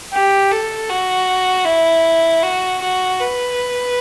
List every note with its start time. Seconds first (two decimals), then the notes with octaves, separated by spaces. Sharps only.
0.13 G4
0.51 A4
0.89 F#4
1.66 E4
2.43 F#4
2.82 F#4
3.20 B4